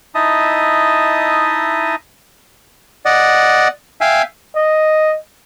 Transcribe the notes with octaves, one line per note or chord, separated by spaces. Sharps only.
D#4 E4 D#5 E5 A5 D#6
D5 D#5 F#5
E5 F5 G5 G#5
D#5